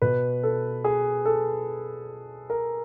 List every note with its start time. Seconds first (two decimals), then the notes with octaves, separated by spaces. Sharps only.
0.02 B2 B4
0.43 A4
0.85 G#4
1.25 A4
2.50 A#4